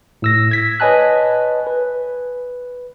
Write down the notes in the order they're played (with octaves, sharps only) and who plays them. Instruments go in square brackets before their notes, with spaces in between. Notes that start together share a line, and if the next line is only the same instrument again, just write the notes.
[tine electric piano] A2 E6 A#6
G#6 B6
B4 C#5 D#5 G#5 A5 F#6
B4